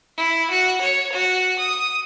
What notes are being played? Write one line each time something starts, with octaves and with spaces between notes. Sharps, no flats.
E4
F#4
C#5
F#4
D#6